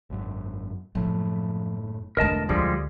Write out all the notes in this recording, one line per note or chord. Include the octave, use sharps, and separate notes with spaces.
G#1 F#2
F#1 A2 F3 F#3
E2 B2 D3 A3 D4 A#4 D#5 A5
D2 F3 G3 G#3